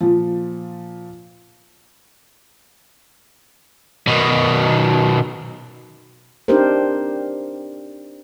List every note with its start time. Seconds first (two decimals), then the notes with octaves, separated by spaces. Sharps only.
0.01 A#2 F3
4.08 B2 D#3
6.48 C4 D4 D#4 G4 A#4 C5